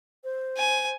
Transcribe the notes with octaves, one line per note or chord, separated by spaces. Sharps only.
C5
G#5